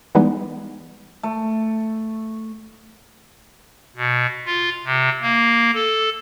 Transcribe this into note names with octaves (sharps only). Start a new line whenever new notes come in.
E3 G3 G#3 B3 D#4
A3
B2
F4
C3
A#3
A4